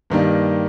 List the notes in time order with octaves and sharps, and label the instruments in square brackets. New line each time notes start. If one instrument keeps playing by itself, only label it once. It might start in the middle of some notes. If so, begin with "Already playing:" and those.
[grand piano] G2 D#3 G3 A#3